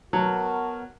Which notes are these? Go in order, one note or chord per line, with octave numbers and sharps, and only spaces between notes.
F#3 B3 F#4 A#4 A5